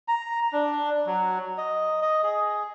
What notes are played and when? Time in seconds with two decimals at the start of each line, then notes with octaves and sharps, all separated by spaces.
0.08 A#5
0.53 D4
1.06 F#3
1.58 D#5
2.02 D#5
2.24 G#4